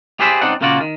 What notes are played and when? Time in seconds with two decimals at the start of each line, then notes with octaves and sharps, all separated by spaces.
0.20 G4 G#4 B4 C5 D5 E5
0.41 C#2 C4 D4 D#4 D5 F#5
0.61 A#2 C#3 A#3 F4 F#4 D5
0.81 D#3